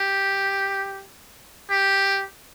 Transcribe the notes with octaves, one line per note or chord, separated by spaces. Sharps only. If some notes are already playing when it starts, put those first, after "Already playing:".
Already playing: G4
G4